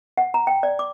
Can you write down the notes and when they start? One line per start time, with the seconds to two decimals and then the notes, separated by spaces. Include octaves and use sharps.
0.18 F#5
0.34 A#5
0.47 G5
0.63 D5
0.79 D6